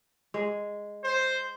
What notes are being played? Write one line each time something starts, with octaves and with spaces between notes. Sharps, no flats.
G#3
C5